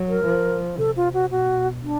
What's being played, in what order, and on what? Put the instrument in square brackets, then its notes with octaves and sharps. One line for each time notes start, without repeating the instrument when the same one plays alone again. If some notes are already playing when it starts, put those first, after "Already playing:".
Already playing: [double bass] F#3
[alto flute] A#4
[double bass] F3
[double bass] C3 [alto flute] A4
[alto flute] F4
F#4
[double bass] B2 [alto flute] F#4
[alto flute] D4